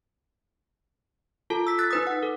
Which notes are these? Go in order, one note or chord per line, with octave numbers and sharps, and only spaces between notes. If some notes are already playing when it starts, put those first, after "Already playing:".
F4 A4 A5
E6 B6
F#6 A6 B6
D#4 B4 D#6
F#5
A4